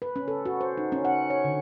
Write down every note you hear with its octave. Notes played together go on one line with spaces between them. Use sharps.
B4
C#4
A4
F#4
C5
D#4
C#4
F#5
C#5
D3